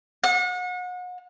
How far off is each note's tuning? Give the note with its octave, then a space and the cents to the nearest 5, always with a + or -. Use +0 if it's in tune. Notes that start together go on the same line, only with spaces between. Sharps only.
F#5 -35